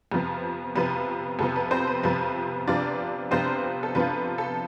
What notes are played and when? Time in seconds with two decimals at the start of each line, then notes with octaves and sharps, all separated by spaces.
0.12 F2 C3 F3 B3
0.76 F2 C3 F3 B3 B4
1.39 F2 C3 F3 B3 A4
1.56 B4
1.71 C4 C5
1.87 B4
2.03 F2 C3 F3 B3 B4
2.67 C3 F3 B3 D4 F4 D5
3.31 C3 F3 B3 C4 D4 F4 C5
3.83 A4
3.95 C3 F3 B3 D4 F4 B4
4.38 A4